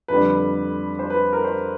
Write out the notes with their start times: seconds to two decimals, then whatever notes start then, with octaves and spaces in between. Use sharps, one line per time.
0.08 F2 D3 G3 B4
0.99 C5
1.10 B4
1.33 A#4
1.44 C5